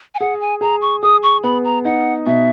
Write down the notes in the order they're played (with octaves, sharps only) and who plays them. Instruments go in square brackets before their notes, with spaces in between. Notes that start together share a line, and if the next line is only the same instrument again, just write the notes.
[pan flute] G#5
[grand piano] G#4 [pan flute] F#5
[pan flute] G#5
[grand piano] G#4 [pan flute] A#5
[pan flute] C#6
[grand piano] G#4 [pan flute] D#6
[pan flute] C#6
[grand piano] B3 [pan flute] B5
[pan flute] A#5
[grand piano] D#4 [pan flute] F#5
[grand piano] B2 [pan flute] E5